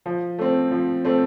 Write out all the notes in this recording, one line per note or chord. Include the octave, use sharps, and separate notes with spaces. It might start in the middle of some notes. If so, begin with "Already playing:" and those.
F3
A3 C4
F3
A3 C4